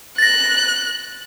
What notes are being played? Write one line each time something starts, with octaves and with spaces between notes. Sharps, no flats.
F#6 A6 A#6